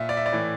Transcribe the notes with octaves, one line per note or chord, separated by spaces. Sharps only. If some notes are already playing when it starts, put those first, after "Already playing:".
Already playing: A#2 E5
D5
E5
D5
A2 E3